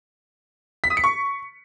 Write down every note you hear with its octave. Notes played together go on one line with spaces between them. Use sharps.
B6
D#6
C#7
C#6